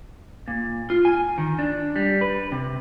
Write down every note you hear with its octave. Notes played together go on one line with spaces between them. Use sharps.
A#2
F4
G#5
D#3
D4
G3
B4
C3